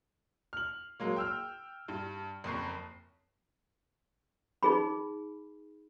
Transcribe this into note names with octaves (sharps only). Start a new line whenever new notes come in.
F6 F#7
F#3 G#3 A#3
G5 E6 F6
G2
F#1 F2 C#6 C7
D#4 G#4 B5